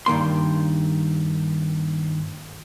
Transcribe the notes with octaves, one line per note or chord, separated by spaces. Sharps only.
G2 D#3 A#3 C6